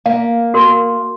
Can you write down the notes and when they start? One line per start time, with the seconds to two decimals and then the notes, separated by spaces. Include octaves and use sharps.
0.06 A#3 F5
0.54 F#4 A#4 C6